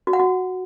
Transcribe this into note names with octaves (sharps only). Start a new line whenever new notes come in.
F#4
F#5
F#4